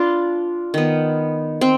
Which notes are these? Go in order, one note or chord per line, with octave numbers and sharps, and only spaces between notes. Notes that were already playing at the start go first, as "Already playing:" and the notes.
Already playing: D4 F4 B4
D#3 B3
C4